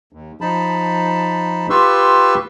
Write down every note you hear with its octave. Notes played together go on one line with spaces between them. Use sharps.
D#2
F3 D#4 A5 B5
F4 G4 B4 C6 C#6 E6